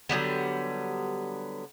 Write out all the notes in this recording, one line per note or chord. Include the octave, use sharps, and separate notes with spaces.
D3 F#3 G3 B3